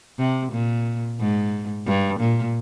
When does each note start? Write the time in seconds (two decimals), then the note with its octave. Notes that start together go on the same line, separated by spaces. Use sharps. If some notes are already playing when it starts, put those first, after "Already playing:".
0.19 C3
0.52 A#2
1.20 G#2
1.87 G2
2.20 A#2